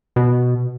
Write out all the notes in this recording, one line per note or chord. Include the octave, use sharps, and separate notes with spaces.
B2